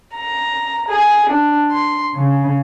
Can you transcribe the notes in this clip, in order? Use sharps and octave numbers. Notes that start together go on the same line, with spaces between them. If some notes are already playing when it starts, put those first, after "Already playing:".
A#5
G#4
D4
C6
C#3